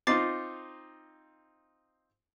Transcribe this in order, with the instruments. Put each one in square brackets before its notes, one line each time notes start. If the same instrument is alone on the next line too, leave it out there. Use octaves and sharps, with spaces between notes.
[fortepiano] C4 D#4 F4 [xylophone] D6 A6 C7